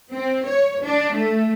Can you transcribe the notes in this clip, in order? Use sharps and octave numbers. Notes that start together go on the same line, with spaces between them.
C4
C#5
D4
A3